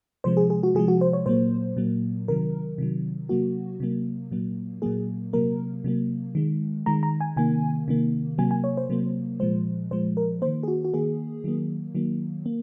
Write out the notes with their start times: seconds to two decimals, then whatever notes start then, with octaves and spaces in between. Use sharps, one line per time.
0.24 C3 F3 G#3 C5
0.37 G#4
0.50 G#4
0.63 F#4
0.75 C3 F3 G#3 G#4
0.88 F#4
1.01 C5
1.13 C#5
1.26 A#2 F#3 A#3 C5
1.77 A#2 F#3 A#3
2.28 C3 D#3 F#3 A#4
2.78 C3 D#3 F#3
3.29 C3 F#3 A#3 F#4
3.80 C3 F#3 A#3
4.31 A#2 F#3 A#3
4.82 A#2 F#3 A#3 G#4
5.33 C3 F#3 A#3 A#4
5.84 C3 F#3 A#3
6.35 D#3 G#3
6.86 D#3 G#3 A#5
7.03 A#5
7.21 G#5
7.37 C3 D#3 A#3 G#5
7.88 C3 D#3 A#3
8.38 C3 F#3 A#3 G#5
8.51 G#5
8.64 C#5
8.77 C5
8.90 C3 F#3 A#3
9.40 A#2 F3 G#3 C5
9.91 A#2 F3 G#3 C5
10.17 A#4
10.42 A#3 C5
10.45 D#3
10.63 G#4
10.68 F#4
10.84 F#4
10.94 D#3 A#3 G#4
11.44 D#3 F#3 A#3
11.95 D#3 F#3 A#3
12.46 A#3